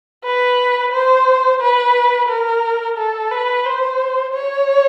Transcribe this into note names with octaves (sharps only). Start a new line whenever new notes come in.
B4
C5
B4
A#4
A4
B4
C5
C#5